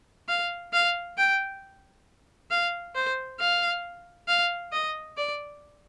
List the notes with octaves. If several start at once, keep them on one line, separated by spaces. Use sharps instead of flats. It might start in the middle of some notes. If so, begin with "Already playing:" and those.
F5
F5
G5
F5
C5
F5
F5
D#5
D5